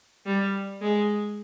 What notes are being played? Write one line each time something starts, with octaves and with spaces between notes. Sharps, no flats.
G3
G#3